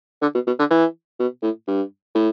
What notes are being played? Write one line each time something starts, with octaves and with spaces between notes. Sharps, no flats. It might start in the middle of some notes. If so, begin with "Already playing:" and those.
D3
B2
B2
D3
E3
B2
A2
G2
A2